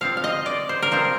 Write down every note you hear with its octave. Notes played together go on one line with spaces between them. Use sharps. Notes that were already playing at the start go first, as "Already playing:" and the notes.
F3 C4 F4 F5
F5
D#5
D5
C5
A#4
F3 C4 F4 C5